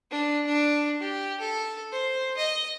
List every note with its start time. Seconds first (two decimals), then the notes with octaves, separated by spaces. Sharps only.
0.11 D4
0.46 D4
1.01 G4
1.40 A4
1.92 C5
2.37 D#5